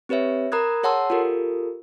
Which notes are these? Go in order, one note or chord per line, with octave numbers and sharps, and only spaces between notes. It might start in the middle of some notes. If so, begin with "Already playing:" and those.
C4 G4 B4 C#5 E5
A#4 A#5 B5 D#6 F#6 G#6
G#4 C#5 F#5 A5 C6 E6
F4 G4 A4 A#4